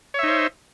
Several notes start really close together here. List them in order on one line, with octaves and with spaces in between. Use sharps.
C#5 E5 D#4 C5